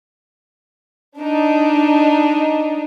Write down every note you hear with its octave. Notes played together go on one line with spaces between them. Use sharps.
D4 D#4